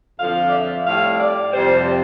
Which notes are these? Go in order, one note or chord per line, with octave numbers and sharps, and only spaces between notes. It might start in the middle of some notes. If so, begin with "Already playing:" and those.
F2 D3 F3 F5
D5
E5
A2 G3 F5
D5
F2 C3 G3 C5
C5
C5